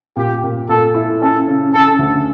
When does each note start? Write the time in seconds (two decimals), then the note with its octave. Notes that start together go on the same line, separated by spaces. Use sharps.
0.16 A#2 G4
0.44 A#2
0.69 A#2 A4
0.95 E4
1.21 C#4 A4
1.48 C#3
1.73 C#3 A4
1.99 D2